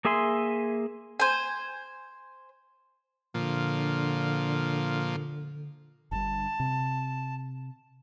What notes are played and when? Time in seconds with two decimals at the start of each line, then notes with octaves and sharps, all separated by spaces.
0.05 A#3 G#4 E5 G#5 C6
1.20 C5 G#5
3.34 A#2 D3 F3
6.11 G1 G2 A5
6.60 C3